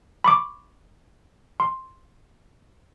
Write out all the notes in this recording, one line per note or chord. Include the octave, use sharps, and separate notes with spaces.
B5 C#6 D6
C6